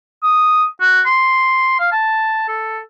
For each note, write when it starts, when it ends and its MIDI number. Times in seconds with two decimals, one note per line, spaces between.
0.23 0.66 87
0.81 1.01 66
1.06 1.78 84
1.80 1.89 77
1.92 2.48 81
2.48 2.80 69